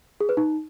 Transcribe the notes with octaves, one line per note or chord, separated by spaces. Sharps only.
G#4
B4
D#4